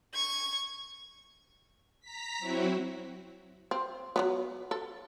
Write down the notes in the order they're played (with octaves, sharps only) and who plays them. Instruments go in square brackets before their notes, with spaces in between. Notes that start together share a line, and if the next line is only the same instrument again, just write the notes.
[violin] C#6 G#6
[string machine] A#5 B6
F#3 C4 E4 F#4
[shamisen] C4
F#3 G3 B3
A4